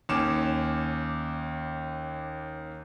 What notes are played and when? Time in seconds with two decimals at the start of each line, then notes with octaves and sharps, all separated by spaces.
0.09 D#2 C#4 D6 E7